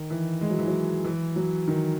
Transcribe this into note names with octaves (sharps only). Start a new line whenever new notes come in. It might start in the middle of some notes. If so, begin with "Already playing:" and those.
Already playing: D#3
E3
G#3
F#3
E3
F#3
E3
F#3
D#3